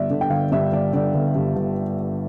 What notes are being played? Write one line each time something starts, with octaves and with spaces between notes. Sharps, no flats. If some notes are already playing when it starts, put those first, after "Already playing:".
Already playing: G1 G2 D5 E5
D3
G5
G1 F5
G2 E5
G1 D5
D3 D5
G1
G2
G1